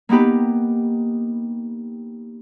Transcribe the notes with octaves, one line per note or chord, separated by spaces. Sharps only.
A#3 B3 D#4 G4 B4